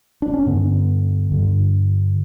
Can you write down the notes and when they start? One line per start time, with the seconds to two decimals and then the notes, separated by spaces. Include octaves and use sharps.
0.22 D4
0.33 C#4
0.46 G2 D3 B3
1.31 G2 D3